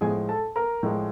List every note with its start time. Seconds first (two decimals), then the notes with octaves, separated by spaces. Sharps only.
0.01 A2 F3 G#3 G#4 G#5
0.29 A4 A5
0.56 A#4 A#5
0.83 A2 F3 G#3